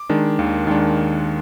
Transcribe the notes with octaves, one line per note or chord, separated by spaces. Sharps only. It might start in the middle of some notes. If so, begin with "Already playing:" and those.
Already playing: D6
D#3 G#3 D4
D#2
D#3 G#3 D4